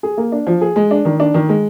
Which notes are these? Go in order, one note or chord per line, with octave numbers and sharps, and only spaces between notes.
G#4
A#3
D4
F3
G#4
G#3
D4
D#3
D4
D#3
G#3